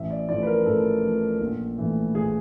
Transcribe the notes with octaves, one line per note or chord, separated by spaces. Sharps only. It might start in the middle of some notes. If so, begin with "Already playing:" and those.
Already playing: A1 E5
D5
A2 F3 D5
B4
A#4
A1 A4
A2 F3
A#1
A2 E3 A3
A#1 G#4